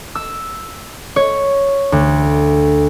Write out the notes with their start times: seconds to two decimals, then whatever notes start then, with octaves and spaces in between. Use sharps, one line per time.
0.15 E6
1.16 C#5
1.92 D2